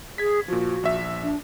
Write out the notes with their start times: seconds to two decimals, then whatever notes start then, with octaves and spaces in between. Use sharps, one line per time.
0.18 G#4 G#6 B6
0.48 A#2 F3 F#4
0.83 A#1 E5
1.22 D4